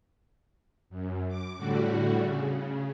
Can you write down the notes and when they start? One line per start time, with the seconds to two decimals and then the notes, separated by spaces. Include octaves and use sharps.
0.89 F#2
1.28 D6
1.57 A2 D3 G3 F#4
2.15 C#3